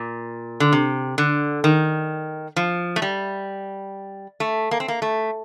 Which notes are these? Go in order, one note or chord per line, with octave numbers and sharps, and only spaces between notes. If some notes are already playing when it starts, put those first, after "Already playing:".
Already playing: A#2
D3
C3
D3
D#3
F3
A3
G3
A3
A#3
C4
A#3
A3